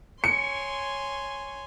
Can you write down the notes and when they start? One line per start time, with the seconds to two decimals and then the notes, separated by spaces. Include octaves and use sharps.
0.24 C#5 G#5 C6 C#7